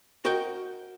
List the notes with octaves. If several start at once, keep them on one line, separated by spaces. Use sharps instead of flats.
F#4 A#4 D#5 F#5 G5